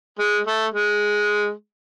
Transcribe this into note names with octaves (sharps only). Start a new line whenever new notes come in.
G#3
A3
G#3